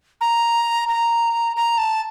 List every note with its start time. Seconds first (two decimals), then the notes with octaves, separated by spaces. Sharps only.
0.21 A#5
0.88 A#5
1.56 A#5
1.78 A5